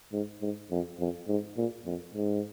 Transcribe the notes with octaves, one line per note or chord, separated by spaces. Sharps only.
G#2
G#2
F2
F2
G#2
A#2
F2
G#2